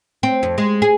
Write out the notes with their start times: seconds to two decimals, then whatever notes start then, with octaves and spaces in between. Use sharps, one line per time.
0.23 C4
0.43 F2
0.58 G#3
0.82 G#4